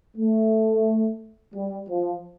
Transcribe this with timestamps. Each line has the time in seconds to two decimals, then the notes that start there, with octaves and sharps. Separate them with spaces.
0.17 A3
1.55 G3
1.90 F3